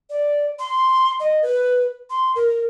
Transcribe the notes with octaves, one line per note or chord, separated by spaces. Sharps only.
D5
C6
D#5
B4
C6
A#4